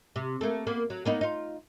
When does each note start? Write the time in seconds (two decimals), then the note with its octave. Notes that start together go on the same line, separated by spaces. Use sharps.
0.16 C3
0.41 A3 A#3
0.67 A#3 B3
0.90 F#3
1.05 A#3 B3 D#4
1.21 D#4 F4